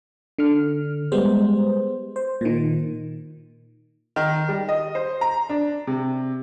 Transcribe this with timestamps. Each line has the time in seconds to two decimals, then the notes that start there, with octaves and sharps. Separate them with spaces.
0.39 D3 F6
1.12 G3 G#3 B3 C5
2.16 C5
2.41 A#2 D#3
4.16 D#3
4.49 G3
4.69 D#5
4.95 C5
5.21 A#5
5.49 D4
5.87 C3